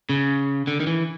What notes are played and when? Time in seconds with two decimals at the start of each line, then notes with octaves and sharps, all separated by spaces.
0.09 C#3
0.67 D3
0.80 D#3
0.87 E3